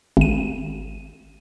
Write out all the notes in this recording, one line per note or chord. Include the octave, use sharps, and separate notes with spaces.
G#1 D#7